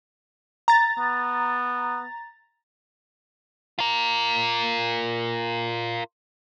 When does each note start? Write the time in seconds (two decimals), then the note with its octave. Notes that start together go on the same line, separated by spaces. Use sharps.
0.68 A#5 A6
0.98 B3
3.79 F4 A#4